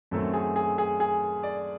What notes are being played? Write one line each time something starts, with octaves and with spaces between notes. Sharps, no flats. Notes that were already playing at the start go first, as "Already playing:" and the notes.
F#2 D#3 F#3 A3 C4 A4
G#4
G#4
G#4
G#4
D5